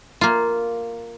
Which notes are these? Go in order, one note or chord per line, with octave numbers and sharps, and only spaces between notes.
A#3 F4